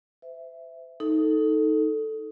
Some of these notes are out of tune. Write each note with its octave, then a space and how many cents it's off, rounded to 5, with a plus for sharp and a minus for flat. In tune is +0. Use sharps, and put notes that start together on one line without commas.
C5 -40 E5 +0
D#4 +10 A4 +0